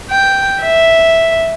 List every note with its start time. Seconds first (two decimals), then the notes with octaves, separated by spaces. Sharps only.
0.10 G5
0.62 E5